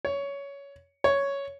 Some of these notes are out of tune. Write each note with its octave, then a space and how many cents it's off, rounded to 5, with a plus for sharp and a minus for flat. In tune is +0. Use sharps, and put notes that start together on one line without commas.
C#5 +15
C#5 +5